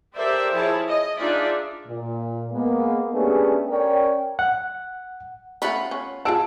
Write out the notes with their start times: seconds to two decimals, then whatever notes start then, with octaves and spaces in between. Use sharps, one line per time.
0.15 G4 A4 A#4 C5 D5 E5
0.52 F3 E4 G#4 C#5 A5
0.87 D#5
1.17 D4 D#4 F4 G#4 D5 E5
1.87 A#2
2.52 G#3 A#3 B3
3.13 A3 B3 C#4 D4 G4 G#4
3.70 C#4 A#4 C#5 D5 G5
4.39 F#5
5.62 A3 C#4 F4 F#5 B5
5.91 C#4
6.25 F4 G#4 F#5 A5 E6 D7